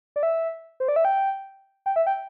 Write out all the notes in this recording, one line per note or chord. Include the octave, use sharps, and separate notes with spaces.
D5
E5
C5
D5
E5
G5
G5
E5
G5